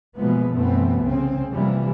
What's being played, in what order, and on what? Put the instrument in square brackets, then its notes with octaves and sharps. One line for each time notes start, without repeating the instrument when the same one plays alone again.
[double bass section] B2 E3 F3 G#3 A#3 B3
F#2 B2 E3 A3 B3 C4
C2 C#3 C4
C3 E3 F3 G3 A#3